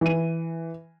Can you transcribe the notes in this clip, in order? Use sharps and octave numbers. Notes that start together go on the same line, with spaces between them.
E3 D#7